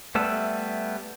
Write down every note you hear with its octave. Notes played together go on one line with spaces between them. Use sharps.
G3 A3 B3 E5